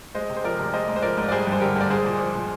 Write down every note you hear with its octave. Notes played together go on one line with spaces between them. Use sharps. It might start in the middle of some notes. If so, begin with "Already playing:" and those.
G#3 C5 D#5
C3
C5
F3 A#4 D5
C3
G#3 C5 D#5
G#2
C5
F3 A#4 D5
G#2
D5
G3 G#4 C5
G2 C5
D3 G4 A#4
G2 D5
G#3 G#4 C5
A#2
F3
A#2